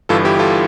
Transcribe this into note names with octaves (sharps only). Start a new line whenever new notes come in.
G1 G2 E3 F4 A4
E4 G4
F4 A4